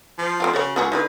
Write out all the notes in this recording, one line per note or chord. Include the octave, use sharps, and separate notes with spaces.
F3
A3 C4 F4
C#3 F#4 C#5
C#2 B3 F#4 G#4
D3 D#4 E4 B4